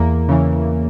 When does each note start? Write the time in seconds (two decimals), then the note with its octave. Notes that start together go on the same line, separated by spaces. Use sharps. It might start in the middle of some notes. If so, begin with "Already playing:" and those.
Already playing: E2 A#3
0.29 C#3 E3